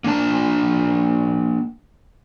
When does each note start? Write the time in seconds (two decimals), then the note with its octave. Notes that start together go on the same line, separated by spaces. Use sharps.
0.04 A#3 D4 A5